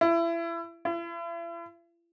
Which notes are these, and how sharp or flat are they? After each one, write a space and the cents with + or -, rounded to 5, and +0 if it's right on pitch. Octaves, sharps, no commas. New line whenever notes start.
E4 +30
E4 +45